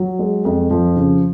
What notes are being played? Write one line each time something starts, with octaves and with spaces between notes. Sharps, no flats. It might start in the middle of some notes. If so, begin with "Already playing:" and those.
Already playing: F#3
G#3
F2
F3
C#3